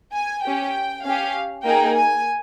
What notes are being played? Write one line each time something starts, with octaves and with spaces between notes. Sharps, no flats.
G#5
C#4 G4 G5
C#4 G4 F5
A#3 D#4 G#4 G5
G#5